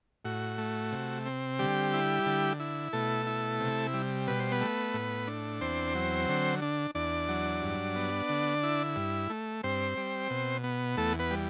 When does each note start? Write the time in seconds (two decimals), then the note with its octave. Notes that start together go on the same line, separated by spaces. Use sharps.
0.25 A2 F#4
0.58 A3
0.92 C3
1.26 C4
1.59 D3 G3 G4
1.93 E4
2.26 D3
2.60 E4
2.93 B2 A3 A4
3.27 E4
3.60 C3
3.94 G3
4.27 B2 B4
4.40 C5
4.52 B3 B4
4.61 A3
4.94 A2
5.27 D4
5.61 E2 C4 C5
5.95 F#3
6.28 D3
6.62 D4
6.95 E2 D4 D5
7.29 F#3
7.63 G2
7.95 B3
8.29 D3
8.63 E4
8.96 G2
9.30 A3
9.63 G2 C4 C5
9.97 G3
10.30 B2
10.64 B3
10.97 E2 A3 A4
11.19 B3 B4
11.31 G3